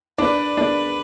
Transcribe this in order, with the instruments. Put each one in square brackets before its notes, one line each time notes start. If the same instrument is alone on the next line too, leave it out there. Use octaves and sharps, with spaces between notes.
[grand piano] D4 D5 [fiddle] B4
[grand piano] D4 D5